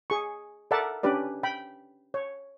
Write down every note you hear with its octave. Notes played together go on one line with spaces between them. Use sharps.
G#4 C#6
A4 A#4 D5 E5 F#5 A5
C#4 D4 G4 B4 D5
G5 B5
C#5